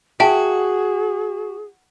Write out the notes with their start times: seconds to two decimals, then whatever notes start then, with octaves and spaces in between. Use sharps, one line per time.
0.20 F#4 G#4 E5 G5 A5